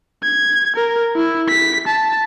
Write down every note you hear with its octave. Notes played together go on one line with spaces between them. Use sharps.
G#6
A#4
E4
B6
A5